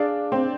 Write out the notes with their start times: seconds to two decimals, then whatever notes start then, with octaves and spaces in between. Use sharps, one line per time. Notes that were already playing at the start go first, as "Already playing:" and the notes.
Already playing: D4 G#4 D5 F5
0.32 C4